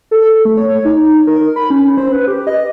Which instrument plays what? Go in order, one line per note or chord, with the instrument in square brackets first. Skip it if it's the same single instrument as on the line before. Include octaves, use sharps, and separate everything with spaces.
[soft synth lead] A4
A3
C#5
D#4
D#4
A#4
B5
C#4
C5
B4
G4
D#5